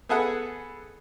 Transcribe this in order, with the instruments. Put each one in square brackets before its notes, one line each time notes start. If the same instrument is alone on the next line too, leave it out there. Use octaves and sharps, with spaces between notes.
[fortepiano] B3 G#4 A4 F#5